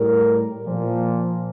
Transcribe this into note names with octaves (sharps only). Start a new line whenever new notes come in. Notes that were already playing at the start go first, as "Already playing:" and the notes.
Already playing: A2 G3 A#4
A#2 F3